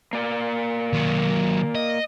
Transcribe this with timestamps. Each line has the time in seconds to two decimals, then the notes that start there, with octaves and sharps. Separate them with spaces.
0.13 A#3 D5
0.93 D#3 F#3
1.75 D#5